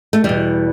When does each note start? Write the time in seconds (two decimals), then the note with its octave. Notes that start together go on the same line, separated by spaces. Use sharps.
0.13 A3
0.24 E2 B2 G3